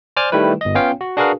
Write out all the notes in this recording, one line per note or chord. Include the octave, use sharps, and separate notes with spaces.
C5 D5 G#5 D6 F6
D#3 G3 A3 E4 B4
G1 D#5
B3 C#4 F4 C#5 F5 G5
F#4
D4 F#4 G#4 A#4 B4 F5